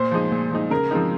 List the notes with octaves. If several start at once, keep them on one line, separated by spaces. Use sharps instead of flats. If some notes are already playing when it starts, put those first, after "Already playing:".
Already playing: A#2 C5
F3 G#3 D#4
A#2
F3 G#3 D#4
C#3 A#4
F3 G#3 C4 D#4